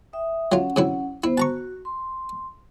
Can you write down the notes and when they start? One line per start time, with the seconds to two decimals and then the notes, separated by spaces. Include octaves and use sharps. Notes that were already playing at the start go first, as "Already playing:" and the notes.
0.13 E5 G5 D#6
0.52 F#3 C#4 F4 F#5
0.76 C3 F#3 E4
1.24 B3 E4 C5
1.38 F#4 A5 A#5 C#6
1.85 C6